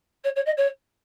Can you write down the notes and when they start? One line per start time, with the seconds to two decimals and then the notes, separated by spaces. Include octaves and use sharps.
0.24 C#5
0.36 C#5
0.46 D#5
0.57 C#5